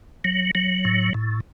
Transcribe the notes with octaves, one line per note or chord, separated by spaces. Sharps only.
F#3
F#3
A2
A2